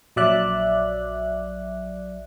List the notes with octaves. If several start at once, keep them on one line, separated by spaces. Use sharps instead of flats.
A#1 F#3 D5 E5 F#6